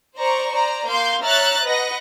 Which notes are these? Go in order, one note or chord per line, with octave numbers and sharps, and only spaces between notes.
C5 D5 A#5 C#6
C5 D5 A#5
A#3 F5 C6 G6
C#5 E5 A#5 F6 F#6 A6
B4 D#5 F#5 A#6